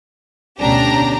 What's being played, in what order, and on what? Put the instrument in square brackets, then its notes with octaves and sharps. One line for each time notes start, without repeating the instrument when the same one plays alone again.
[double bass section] D2 B2 C#4 [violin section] D4 G4 A#5